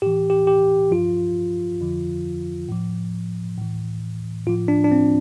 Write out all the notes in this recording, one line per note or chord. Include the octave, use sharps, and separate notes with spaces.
A2 E3 G4
G4
G4
G2 F3 F4
F2 D3 F3
A2 F3
A2 E3
A2 F3 F4
D4
D4
C4